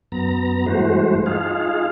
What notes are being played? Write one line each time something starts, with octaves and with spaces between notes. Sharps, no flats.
F#2 B3 A#5
G2 E3 G#3 A3 F#4 C5
D#4 F4 G#4 F5